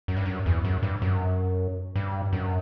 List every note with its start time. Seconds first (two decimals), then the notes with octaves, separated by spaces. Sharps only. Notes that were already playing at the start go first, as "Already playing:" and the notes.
0.08 F#2
0.17 G2
0.26 F#2
0.46 E2
0.65 F#2
0.83 G2
1.02 F#2
1.96 G2
2.33 F#2